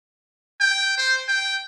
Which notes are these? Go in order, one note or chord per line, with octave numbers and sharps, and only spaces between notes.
G5
C5
G5